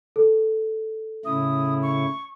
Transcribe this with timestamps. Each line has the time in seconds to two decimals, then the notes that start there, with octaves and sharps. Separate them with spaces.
0.16 A4
1.25 A2 C#3 E4 D#6
1.82 C#6